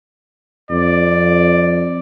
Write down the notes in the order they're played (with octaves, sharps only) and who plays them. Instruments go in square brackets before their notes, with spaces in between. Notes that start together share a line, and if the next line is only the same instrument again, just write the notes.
[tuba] F2 [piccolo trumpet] D5